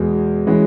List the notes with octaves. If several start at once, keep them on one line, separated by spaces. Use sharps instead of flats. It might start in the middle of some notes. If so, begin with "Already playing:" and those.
Already playing: E2 B2 G#3
E3 G#3 C#4 F#4